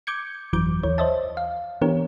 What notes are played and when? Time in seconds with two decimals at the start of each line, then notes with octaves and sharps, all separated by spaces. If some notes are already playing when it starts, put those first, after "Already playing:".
0.07 D6 G6 G#6 C#7
0.53 G1 F2 E3 F#3 D6 G6
0.83 D#2 E3 C#5
0.98 C5 C#5 D#5 E5 A5
1.37 F5
1.82 E3 B3 D4 G4 A#4 C#5